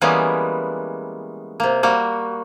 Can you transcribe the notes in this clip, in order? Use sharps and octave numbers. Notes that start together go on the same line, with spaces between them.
E3 G3 G#3 A#3 B3 C#4
C3 A#3
G3 A#3 F#4